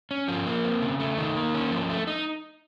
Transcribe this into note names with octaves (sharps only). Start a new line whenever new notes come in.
C#4
F3
A#3
C4
C#3
A3
D#3
A#3
C#4
F3
A3
D#4